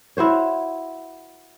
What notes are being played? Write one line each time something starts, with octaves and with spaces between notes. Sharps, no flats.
E4 F#4 C5 C#5